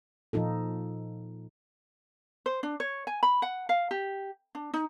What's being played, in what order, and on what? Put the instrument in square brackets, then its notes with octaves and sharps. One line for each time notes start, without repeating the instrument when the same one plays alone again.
[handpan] A#2 F3 D#4 F4 A4
[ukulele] C5
D4
C#5
G#5
B5
F#5
F5
G4
D4
D#4